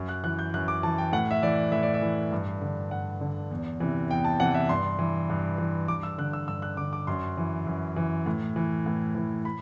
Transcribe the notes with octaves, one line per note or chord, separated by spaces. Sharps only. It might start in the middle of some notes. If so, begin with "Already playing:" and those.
Already playing: F#2
F#6
E3 F#6
G6
F#2 F#6
D6
E3 A5
G5
A2 F#5
E5
E3 D5
A2 E5
D5
E5
E3
G2
D3
G2 F#5
D3
E2
C3 E3
E2 G5
A5
C3 E3 F#5
E5
G2 C6
E3
G2
E3
G2 D6
E6
D3 F#6
E6
G2 E6
F#6
D3 D6
D6
F#2 C6
E3
F#2
E3
A2
E3
A2
E3
B5